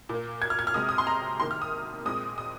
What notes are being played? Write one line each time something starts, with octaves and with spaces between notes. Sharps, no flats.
A#2 A#3
G#6
F6
G#6
F6
C3 G#3 C4 D#6
D#6
C6
A#5
C3 D#3 A#3 C6
F6
D#6
A#2 G#3 C4 D#6
D#6